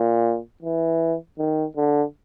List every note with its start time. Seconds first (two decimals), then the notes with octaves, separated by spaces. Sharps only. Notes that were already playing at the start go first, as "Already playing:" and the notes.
Already playing: A#2
0.62 E3
1.38 D#3
1.77 D3